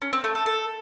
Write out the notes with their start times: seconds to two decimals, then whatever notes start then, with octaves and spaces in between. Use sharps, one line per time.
0.02 C#4
0.13 C4
0.24 A3
0.35 A4
0.46 A4